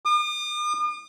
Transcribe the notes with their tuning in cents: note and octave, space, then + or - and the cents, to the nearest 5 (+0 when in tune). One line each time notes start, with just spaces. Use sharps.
D#6 -45